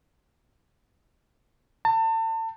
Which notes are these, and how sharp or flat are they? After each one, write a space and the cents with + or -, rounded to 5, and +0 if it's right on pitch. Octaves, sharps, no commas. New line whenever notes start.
A5 +35